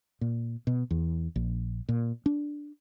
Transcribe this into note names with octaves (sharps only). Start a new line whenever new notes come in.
A#2
B2
E2
A#1
A#2
D4